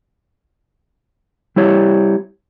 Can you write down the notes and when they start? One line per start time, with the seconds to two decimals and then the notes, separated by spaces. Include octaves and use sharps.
1.56 G3 E4 G4 C#5